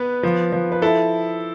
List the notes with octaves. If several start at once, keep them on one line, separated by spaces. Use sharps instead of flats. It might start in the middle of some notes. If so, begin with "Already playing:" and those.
Already playing: B3 B4
F3
F3
B4
E4 A4